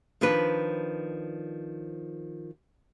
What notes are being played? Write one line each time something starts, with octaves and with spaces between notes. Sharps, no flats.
D#3 F3 C4 D4 B4